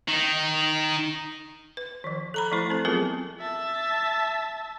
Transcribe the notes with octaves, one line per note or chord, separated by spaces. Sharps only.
D#3 D#4
B4
D#3 F3
A4 A#5 B5
F3 A3 E4 C5
C4 A4
F#3 B3 C4 F4 G#4 A#4
E5 A5